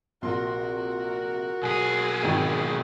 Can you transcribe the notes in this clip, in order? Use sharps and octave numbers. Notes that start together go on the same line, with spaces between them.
A#1 C3 F#4 A#4 C6
B1 G#4 G#5
G#1 F2 D#3